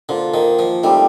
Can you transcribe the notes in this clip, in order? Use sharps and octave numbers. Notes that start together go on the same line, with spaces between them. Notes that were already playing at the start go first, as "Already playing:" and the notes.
D3 A#3 F4 C5
D#3
F3
D#3 G3 A3 C4 G4